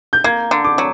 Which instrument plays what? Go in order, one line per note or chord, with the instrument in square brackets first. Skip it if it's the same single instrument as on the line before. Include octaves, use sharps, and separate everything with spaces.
[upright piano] G6
[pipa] A#3 [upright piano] G#6
[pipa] D3
[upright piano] D6
[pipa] F#3